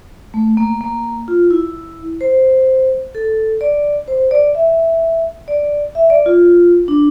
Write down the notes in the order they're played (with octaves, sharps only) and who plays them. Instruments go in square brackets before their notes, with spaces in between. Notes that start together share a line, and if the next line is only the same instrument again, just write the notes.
[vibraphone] A3
A#3
A#3
F4
E4
C5
A4
D5
C5
D5
E5
D5
E5
D5
F4
D4